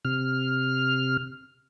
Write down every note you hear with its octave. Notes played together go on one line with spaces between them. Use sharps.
C3 F6